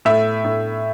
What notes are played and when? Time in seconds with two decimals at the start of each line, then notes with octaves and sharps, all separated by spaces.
0.05 A2 E5
0.45 A2